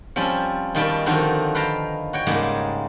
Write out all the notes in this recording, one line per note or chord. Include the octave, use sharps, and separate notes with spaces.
F3 G3 C4 C#4
B2 D#3 G3 F4 G5 A5
D3 D#3 F3 C4 D#4 F#4
B4 F5 G5 A5 A#5
F#4 C#5 G5
G#2 C#3 G3 G#3 A#3 G#4